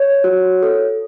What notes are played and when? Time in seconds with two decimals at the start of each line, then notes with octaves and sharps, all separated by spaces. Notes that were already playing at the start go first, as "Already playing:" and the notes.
Already playing: C#5
0.24 F#4
0.63 A4